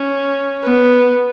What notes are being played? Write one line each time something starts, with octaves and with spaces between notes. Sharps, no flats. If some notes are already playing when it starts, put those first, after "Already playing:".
Already playing: C#4
B3